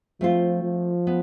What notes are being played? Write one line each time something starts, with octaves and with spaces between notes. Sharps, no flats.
F3 A3 C4 F4
F3
B3